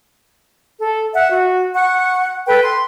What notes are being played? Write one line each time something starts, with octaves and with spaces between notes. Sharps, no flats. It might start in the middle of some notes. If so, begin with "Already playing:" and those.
A4
E5 F#5
F#4
F#5 C#6
A4 B4 G5
C6